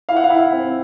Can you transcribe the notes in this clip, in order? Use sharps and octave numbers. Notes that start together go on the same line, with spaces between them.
E4 F5
F#5
F5
E4
C4